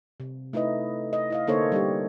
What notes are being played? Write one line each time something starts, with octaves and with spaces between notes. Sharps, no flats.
C3
A3 D#4 E4 B4 D#5
D#5
E4 D#5 F5
D3 A#3 D#4 A4 C5 C#5
G3 D4 G4